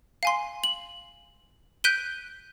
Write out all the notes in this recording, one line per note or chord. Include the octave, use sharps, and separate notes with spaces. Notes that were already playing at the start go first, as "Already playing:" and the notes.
F5 G#5 C6
F#7
F#6 G6 B6 D7 D#7 G7